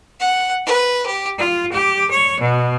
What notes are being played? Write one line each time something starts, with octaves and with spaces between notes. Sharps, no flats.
F#5
B4
G4
F4
G4
C#5
B2